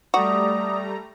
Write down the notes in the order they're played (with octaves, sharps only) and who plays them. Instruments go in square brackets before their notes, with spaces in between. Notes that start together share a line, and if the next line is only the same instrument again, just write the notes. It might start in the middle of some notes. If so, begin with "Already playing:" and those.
[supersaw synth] G3 A3 A#5 [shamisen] F#4 [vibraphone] D5 D6 D#6